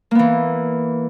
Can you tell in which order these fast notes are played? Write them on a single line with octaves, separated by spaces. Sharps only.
A#3 B3 E3